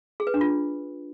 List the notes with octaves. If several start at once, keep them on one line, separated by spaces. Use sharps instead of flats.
G#4
B4
D4
F4